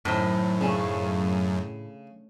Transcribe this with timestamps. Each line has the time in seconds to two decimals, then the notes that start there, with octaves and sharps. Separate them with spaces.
0.05 F#2 A2 D#3 C5
0.61 C#3 A3 C#4 D4